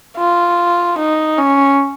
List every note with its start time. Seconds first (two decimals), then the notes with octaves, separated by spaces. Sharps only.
0.18 F4
0.98 D#4
1.38 C#4